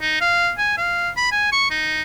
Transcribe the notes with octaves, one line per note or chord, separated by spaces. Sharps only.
D#4
F5
G#5
F5
B5
G#5
C#6
D#4